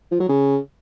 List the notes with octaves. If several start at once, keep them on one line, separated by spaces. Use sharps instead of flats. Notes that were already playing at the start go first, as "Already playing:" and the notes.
F3
F#3
C#3